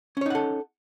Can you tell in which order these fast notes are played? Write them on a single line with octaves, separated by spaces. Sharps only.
C#4 C#5 D#4 F#5 A4